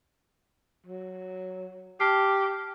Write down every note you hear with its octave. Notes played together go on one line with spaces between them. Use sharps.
F#3
G4 A5 F6 C7